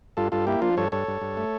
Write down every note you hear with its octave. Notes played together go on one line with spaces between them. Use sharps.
G2 F4 A4
G2 F4 A4
A#3 E4 G4
F3 D4 F4
G2 A4 C#5
G2 A4 C#5
G2
G2
A3